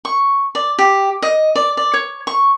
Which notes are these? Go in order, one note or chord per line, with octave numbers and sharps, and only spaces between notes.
C#6
D5
G4
D#5
D5
D5
C#5
C#6